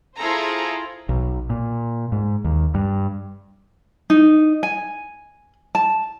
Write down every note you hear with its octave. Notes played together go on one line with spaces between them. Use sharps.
E4 F4 G#4 A4 C5 A#5
B1
A#2
G#2
D#2
G2
D#4
G#5
A5